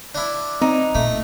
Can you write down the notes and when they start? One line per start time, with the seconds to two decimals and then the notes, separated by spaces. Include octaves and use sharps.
0.15 D4 E4
0.61 C4 D#4
0.95 A#2 A3